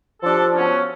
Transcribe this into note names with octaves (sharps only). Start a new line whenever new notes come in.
F3 D4 G4 A4
F#3 B3 C#4